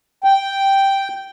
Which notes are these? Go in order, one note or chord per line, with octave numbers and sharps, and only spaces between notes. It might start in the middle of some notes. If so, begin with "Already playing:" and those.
G5